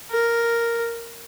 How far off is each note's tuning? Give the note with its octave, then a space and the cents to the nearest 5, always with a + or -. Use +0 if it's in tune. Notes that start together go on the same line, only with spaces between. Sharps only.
A#4 +0